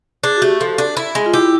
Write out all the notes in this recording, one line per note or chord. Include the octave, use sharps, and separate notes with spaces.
D4 G#4
F#4
A3 G4
F3 A4
D4
E4
G#3
F4
E4 G4